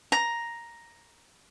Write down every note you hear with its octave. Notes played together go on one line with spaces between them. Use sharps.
A#5